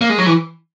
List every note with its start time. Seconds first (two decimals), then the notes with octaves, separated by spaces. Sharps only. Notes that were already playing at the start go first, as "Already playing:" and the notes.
0.01 A#3
0.09 G#3
0.18 F#3
0.26 E3